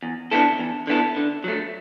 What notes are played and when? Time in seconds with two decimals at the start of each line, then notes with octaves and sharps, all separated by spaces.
0.03 E2
0.31 D3 B3 E4 A4
0.59 E2
0.87 D3 B3 E4 A4
1.17 D3
1.44 F#3 A3